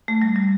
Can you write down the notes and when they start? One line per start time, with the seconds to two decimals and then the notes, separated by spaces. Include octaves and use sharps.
0.08 A3
0.22 G3
0.36 G3